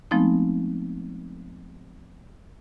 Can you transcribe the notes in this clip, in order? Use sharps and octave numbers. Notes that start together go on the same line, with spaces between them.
F3 G#3 A3 B3 C4 D#4